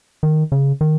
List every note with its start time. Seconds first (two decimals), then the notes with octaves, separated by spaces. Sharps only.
0.23 D#3
0.52 C#3
0.81 D#3